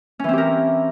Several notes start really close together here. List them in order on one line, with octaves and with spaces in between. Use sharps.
C#4 E3 C4 G4 A#4